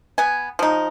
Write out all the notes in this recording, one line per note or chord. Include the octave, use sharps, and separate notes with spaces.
B3 G#5
F3 D#4